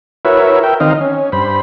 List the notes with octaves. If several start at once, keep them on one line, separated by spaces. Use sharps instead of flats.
E4 F#4 A#4 B4 C#5 E5
A#4 E5 G5
D#3 C4 D#4 D#5 F5
C#4
G2 C5 B5